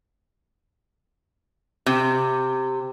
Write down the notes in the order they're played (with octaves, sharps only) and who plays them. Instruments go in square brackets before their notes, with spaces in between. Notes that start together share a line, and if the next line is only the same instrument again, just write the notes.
[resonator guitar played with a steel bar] C3